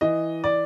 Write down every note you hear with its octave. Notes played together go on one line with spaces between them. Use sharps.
E3 D#5
D5